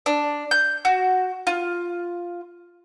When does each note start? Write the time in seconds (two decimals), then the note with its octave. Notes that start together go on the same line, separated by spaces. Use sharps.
0.06 D4
0.51 G6
0.85 F#4
1.47 F4